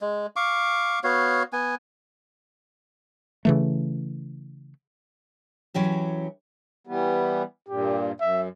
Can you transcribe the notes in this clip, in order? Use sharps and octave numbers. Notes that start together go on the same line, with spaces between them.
G#3
F5 C#6 D6
B3 F#4 C#5 F5
B3 G#5
C#3 E3 A3
E3 F#3 C#4 G4
E3 G3 B3
G2 A#2 G4
F#2 E5